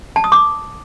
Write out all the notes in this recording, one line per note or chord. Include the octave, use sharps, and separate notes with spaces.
A5
D#6
D6